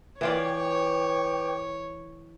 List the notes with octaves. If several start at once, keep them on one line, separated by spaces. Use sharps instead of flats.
E3 F4 B4 C#5 D5 G5 D6